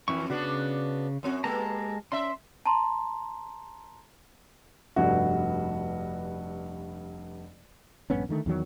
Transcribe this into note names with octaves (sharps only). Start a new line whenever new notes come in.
F2 E3 E4 C#6
C#3 B3 D4 F#4 F#6
F#2 C4 F#4
G#3 A#3 G4 A4 A5 A#5
C#4 E5 C6
A5 A#5 C6
F1 G2 F#4
A#1 G2 B3 C#4
D3 D#3 A3
E2 D#3 F#3